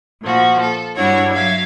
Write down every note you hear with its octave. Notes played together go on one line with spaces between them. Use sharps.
A#2 F3 F#4
A4
G2 G3 D4 E4 F#4 C#5
F#3 E5 F5 G#6